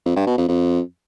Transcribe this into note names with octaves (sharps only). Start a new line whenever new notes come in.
F2
G2
B2
F2
F2